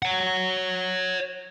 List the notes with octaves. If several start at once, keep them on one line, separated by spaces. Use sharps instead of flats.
C#5 F#5